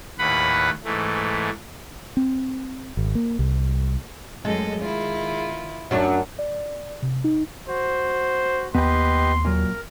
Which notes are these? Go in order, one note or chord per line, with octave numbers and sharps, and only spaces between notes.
D#2 A2 B4 F#5 B5
G#2 E3 A3
C4
G#1
A#3
C2
F#2 G#3 A4 D#5
D#3 E4 F4
F#2 F#3 D4
D5
C3
D#4
F#4 C5
D#2 B3 G4 B4 D#5 G5 C6
A#2 F#3 A#4